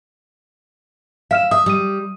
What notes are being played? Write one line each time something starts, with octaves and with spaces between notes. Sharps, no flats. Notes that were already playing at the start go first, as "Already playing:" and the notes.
E5 F5 F6 E7
E5 D#6
G3 D#6 D#7